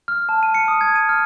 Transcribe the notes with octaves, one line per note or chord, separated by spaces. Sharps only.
F6
A5
D#7
C#7
D#6
G#6
D#7
F6